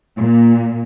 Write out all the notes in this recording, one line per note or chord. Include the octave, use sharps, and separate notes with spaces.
A#2